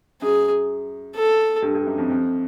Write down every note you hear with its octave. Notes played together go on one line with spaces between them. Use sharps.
F#2 G#4
A4
G2
G2
F#2
F2
F2